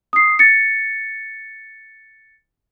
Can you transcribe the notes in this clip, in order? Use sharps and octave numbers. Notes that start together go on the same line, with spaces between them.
D#6 C7
A6 C#7